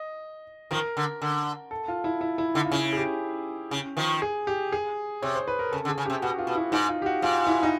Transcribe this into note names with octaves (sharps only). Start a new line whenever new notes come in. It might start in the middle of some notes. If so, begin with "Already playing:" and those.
Already playing: D#5
D#3 F3 A#4
D3
D3
A4
F4
E4
E4
E4
D3 D#4
F4
C#3 E4
G#4
G4
C#3
D#3 F3
G#4
G4
G#4
C3 C#5
C5
B4
A#4
C#3 A4
D3
G#4
C#3
C3 G4
B2 F#4
F4
B2
E4
G#2 D#4
F4
G4
F#4
G#2 F4
E4
D#4